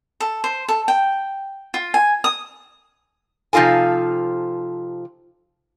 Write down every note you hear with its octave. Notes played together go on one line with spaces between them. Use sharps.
A4
C5
A4
G5
F4
G#5
D#6
C3 F3 D#4 F4 A4 G#5